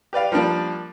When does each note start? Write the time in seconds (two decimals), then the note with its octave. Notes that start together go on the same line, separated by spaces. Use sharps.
0.13 G4 B4 D5 F5
0.32 F3 G3 A#3 D4